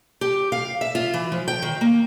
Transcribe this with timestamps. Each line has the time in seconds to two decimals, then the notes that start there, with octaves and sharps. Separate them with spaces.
0.21 G4
0.52 F5
0.81 E5
0.95 F4
1.14 E3
1.32 F3
1.48 G5
1.62 D#3
1.81 A#3